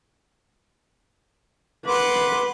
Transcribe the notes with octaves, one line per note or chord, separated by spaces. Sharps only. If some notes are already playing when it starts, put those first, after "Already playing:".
B4 F#5 C6 D6